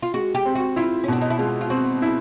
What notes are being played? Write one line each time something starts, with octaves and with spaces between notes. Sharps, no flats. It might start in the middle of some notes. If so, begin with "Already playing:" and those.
F4
G#3 F#4
G4
C4
F#4
E4 F4
C#4
B2 D4
D#4
E4
G#3 F4
F4
C4 F#4
E4